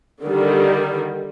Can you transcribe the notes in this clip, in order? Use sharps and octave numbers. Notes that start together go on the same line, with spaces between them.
D3 D#3 G3